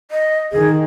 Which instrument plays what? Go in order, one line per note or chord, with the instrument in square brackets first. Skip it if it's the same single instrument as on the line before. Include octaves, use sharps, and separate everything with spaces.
[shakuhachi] D#5
[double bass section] D#3 [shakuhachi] G#4